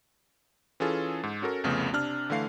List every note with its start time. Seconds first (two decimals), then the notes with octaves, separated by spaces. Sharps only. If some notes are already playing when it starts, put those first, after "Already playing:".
0.80 E3 C#4 F4 G#4 A4
1.23 G#2
1.42 C#4 F#4 A4 A#4
1.64 C2 F2 C#3 A3 B3
1.93 C3 D4 F6
2.30 D3 E3 A3 F5 C7